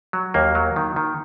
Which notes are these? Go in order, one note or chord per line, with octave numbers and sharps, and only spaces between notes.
F#3
D#2 A#3
F#3
D#3
D#3